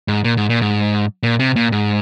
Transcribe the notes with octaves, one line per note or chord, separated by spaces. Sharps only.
G#2
A#2
G#2
A#2
G#2
A#2
C3
A#2
G#2